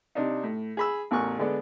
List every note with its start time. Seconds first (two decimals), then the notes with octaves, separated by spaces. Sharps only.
0.15 C3 D4 D#4
0.43 A2
0.77 G#4 B5 E6
1.11 A1 E2 A#4 G#5 C#6 F#6
1.39 D3 G#3 B3 D5